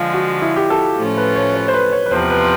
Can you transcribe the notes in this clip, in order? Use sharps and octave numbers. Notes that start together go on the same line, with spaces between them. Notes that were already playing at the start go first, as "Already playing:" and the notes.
Already playing: D3 F3 G#3 F4
F#4
E4
G4
A4
A2 F3 A3 C#4 F4
B4
C#5
C#5
C5
B4
C#5
B4
E2 C3 F3 C5
B4